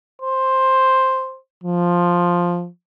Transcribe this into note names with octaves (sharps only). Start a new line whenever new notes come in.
C5
F3